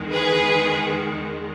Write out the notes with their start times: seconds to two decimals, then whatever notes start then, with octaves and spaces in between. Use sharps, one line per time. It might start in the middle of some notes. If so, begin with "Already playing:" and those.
Already playing: E2 D#3 G#3
0.11 G#4 B4